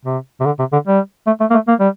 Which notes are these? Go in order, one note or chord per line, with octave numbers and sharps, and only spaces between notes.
C3
C3
D3
C3
D3
G3
A3
A3
A#3
A3
A#3
G3